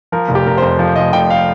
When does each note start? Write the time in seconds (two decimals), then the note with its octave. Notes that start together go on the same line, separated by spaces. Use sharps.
0.12 F3 A#4
0.29 F1
0.35 G4
0.47 F1 A#4
0.58 F2 C5
0.79 F3
0.96 F1 D#5
1.13 F1 G5
1.30 F5